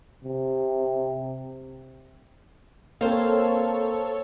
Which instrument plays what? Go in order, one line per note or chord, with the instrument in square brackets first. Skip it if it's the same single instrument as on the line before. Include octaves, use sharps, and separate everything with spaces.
[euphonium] C3
[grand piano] A#3 C4 [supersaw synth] A4 C#5 [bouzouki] C5 F5